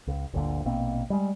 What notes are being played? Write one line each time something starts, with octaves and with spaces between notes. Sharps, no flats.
C#2
G1 D2 A#2 D3
A#1 B2 A#3 C4
G3 G#3